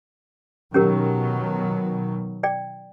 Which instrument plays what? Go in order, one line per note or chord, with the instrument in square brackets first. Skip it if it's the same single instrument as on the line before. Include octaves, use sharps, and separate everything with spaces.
[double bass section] B2 D#3 F#3 [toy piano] C#4 G4 A#4
[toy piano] D5 G5